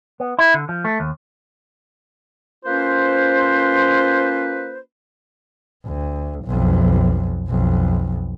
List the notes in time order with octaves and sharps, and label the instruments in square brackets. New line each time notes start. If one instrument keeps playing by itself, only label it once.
[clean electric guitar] B3
E4
D3
F3
A3
D#2
[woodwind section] A#3 C#4 F4 B4 C5
[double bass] D2
B1 F2
B1 F2